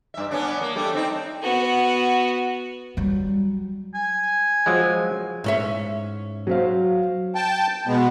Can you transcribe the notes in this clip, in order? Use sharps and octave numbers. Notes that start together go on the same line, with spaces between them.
G2 E5
B3 C#4 D4
A#3
G3 A3 D4
C4 D#4
B3 F#4
F#3 G3
G#5
F3 F#3 G#3
G#2 C#4 E5
F#3 C5 F5
G5 A5
B2 G#3 B3